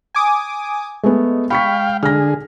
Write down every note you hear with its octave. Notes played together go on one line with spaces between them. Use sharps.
G#5 D6 D#6
G#3 A3 B3
F5 G5 B5 C#6 B6
D3 G#4 F6 A#6